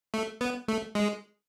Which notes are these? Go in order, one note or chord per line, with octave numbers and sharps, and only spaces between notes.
A3
B3
A3
G#3